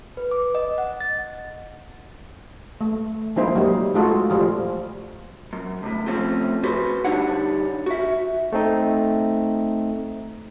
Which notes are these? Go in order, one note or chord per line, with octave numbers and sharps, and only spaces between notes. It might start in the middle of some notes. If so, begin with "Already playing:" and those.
B4
D6
D#5
F#5
A6
A3
F3 G#3 A#3 D#4 E4 C5
F#3 G3 D#4
G#3 A3 D#4 F4 F#4 A4
F3 G3 F4
F#2
C#2 A2
F3 A3 C4 C#4
F#4 G#4 B4 C5
D3 G3 D4 D#4 C#5 F#5
F#4 E5
A3 C4 D#4